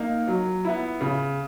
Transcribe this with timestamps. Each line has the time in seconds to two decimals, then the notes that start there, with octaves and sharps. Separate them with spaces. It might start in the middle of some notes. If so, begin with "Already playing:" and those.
Already playing: A#3 D#4
0.27 F#3
0.65 B3 E4
1.01 C#3